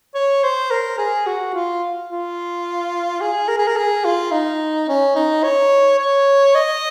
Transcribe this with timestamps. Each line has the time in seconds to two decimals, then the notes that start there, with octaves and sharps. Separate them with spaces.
0.15 C#5
0.43 C5
0.71 A#4
0.98 G#4
1.26 F#4
1.54 F4
2.10 F4
3.21 G#4
3.49 A#4
3.58 G#4
3.67 A#4
3.77 G#4
4.05 F4
4.32 D#4
4.89 C#4
5.15 D#4
5.43 C#5
5.99 C#5
6.55 D#5